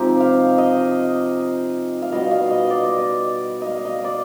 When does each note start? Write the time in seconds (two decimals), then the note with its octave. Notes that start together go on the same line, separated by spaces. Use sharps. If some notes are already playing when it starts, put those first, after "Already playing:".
Already playing: C3 F3 G#3 C4 D#4 F4 G4
0.20 F5
0.58 D#5
2.02 F5
2.12 B2 G3 D#5
2.31 F5
2.50 D#5
2.70 D5
2.85 D#5
2.98 D5
3.62 D#5 F5
3.85 D#5
4.04 D5